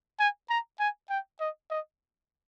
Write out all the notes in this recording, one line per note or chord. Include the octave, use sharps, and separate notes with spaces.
G#5
A#5
G#5
G5
D#5
D#5